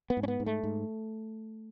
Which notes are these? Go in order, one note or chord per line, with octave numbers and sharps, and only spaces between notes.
B3
G#2
C#4
B3
G#2
A3
G#2